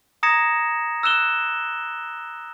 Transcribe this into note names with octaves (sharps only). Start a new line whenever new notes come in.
A#5 D#6 G#6 A#6 C#7 E7
E6 F#6 E7 G7